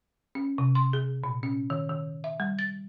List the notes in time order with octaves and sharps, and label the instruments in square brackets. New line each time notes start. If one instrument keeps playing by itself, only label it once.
[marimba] C#4
C3
C6
G#4
A#2
C#4
D#3
D#3
E5
G3
A6